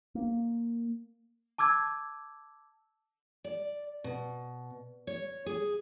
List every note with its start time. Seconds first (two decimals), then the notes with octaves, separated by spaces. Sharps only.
0.15 A#3
1.58 A5 D6 E6 G#6
3.44 D5
4.04 B2
5.07 C#5
5.46 G#4